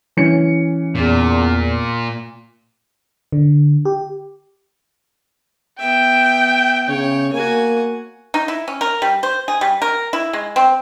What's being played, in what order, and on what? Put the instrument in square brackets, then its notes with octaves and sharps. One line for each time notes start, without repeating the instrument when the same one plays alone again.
[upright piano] E3 C#4 C#7
[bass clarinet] E2 [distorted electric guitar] A#2
[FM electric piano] D3
G4
[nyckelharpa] B3 E5 [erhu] G5
[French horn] C#3 [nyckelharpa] C#5
[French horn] A#3 [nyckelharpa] F#4 G#5
[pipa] D#4
E4
C#4
A#4
G3
C5
G#4
G3
A#4
E4
G#3
C4